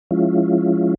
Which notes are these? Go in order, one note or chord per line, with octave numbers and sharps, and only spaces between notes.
F3 G#3 C#4 E4 F4